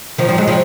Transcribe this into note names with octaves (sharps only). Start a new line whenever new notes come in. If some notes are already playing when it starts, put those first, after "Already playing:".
D#3 F3
F3 G3
F#3 G#3
F3 G3